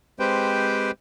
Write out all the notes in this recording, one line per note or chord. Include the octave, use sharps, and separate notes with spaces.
G#3 C4 G4 B4 C5 G5